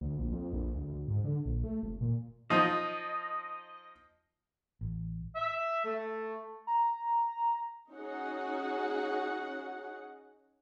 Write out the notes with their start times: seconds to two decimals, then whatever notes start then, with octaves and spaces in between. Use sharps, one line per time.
0.01 D2
0.18 A#1
0.32 F2
0.53 A#1
0.74 D2
0.93 D2
1.08 G#2
1.24 D3
1.45 A#1
1.64 A3
1.83 F1
2.01 A#2
2.50 F3 D#4 D#5
4.81 A1
5.35 E5
5.85 A3
6.67 A#5
7.91 C#4 D#4 F#4 G#4 F#5